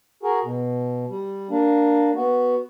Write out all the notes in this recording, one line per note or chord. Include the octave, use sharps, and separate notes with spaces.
F#4 G#4 A#4
B2
G3
A#3 D4
B3 F#4